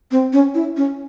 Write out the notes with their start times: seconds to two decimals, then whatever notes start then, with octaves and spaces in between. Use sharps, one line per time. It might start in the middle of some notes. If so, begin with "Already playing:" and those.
0.11 C4
0.33 C#4
0.55 E4
0.77 C#4